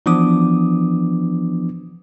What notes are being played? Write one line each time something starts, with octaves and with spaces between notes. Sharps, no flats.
E3 F3 B3 D4 D6 D#6